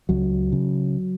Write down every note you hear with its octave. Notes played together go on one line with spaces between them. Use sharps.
C#2 F#3
C#3